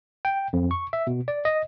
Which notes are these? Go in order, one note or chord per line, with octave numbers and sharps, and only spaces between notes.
G5
F2
C#6
E5
B2
D5
D#5